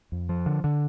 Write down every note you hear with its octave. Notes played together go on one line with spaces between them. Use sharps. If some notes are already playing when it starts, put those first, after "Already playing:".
F2
F3
D3
D3